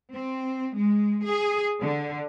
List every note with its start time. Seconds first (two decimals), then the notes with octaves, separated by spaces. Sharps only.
0.12 C4
0.74 G#3
1.25 G#4
1.81 D3